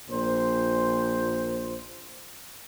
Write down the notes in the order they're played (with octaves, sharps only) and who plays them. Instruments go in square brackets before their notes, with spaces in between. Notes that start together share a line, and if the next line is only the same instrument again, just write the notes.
[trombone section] A#1 A#2 C5